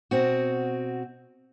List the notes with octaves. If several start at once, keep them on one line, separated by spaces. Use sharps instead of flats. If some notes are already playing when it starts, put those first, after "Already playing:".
B2 C4 F#4